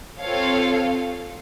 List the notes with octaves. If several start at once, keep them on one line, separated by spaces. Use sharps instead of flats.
C4 F4 A4 C#5 F5